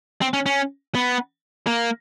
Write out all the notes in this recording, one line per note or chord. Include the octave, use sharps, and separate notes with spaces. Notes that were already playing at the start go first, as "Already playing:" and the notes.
C4
C#4
C#4
B3
A#3